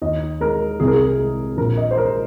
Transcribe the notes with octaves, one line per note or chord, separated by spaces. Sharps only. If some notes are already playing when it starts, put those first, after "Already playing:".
D#2 D#5
G#3 A#4
C2 G#4
A#4
G#4
G#3
A#1 A#4
D#5
C5
G#3 A#4